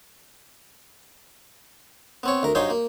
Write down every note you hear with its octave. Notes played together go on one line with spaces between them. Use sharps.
B3 C4 C#5
D2 A#4
G2 F#3 D#4 C5 G#5 C6
A#3